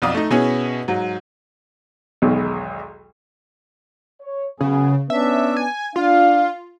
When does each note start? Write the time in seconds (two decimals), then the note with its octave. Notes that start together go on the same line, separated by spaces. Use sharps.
0.02 B1 F2 F4 D5 D#6
0.15 A3 D#4
0.31 B2 B3 C#4 E4 G#4
0.88 G#2 F#3
2.22 B1 E2 B2 D#3 F#3 G#3
4.22 C#5
4.61 F#2 C#3 B3 G#4
5.10 B3 C#4 D4 E5
5.57 G#5
5.96 D4 F4 F5